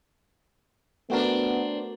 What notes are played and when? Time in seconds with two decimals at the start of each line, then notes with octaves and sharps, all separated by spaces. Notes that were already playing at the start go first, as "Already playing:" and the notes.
1.10 A3 B3 C4 D4 F#4 A#4